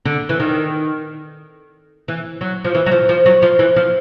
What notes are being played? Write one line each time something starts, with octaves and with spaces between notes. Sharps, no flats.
D3
E3
D#3
E3
F#3
F3
E3
F#3
F3
F3
F#3
F3
E3
F3